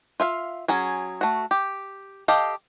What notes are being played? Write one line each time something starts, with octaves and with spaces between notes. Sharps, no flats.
F4 E5 F5
F#3 C#4 G#4
A3 F#4
G4
G4 A4 D#5 F5